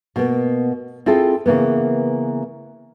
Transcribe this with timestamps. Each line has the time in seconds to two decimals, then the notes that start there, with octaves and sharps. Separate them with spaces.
0.16 B2 A#3 B3
1.06 C4 E4 F4 G#4 A4
1.46 C#3 E3 A#3 B3